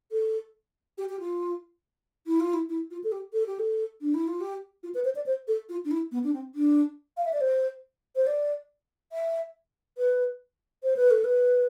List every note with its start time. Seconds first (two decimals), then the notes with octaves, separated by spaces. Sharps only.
0.12 A4
0.98 G4
1.09 G4
1.20 F4
2.27 E4
2.40 F4
2.53 E4
2.69 E4
2.91 F4
3.04 A4
3.12 G4
3.33 A4
3.46 G4
3.59 A4
4.01 D4
4.14 E4
4.27 F4
4.41 G4
4.83 F4
4.95 B4
5.05 C5
5.15 D5
5.26 C5
5.48 A4
5.69 F4
5.85 D4
5.91 E4
6.12 B3
6.24 D4
6.33 C4
6.55 D4
7.17 F5
7.25 E5
7.33 D5
7.41 C5
8.16 C5
8.27 D5
9.12 E5
9.98 B4
10.83 C5
10.97 B4
11.11 A4
11.24 B4